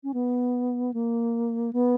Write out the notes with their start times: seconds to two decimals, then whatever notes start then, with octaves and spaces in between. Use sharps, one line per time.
0.03 C#4
0.14 B3
0.94 A#3
1.73 B3